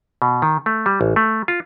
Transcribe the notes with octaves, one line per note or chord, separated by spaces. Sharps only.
B2
D#3
A3
G3
A1
A3
F4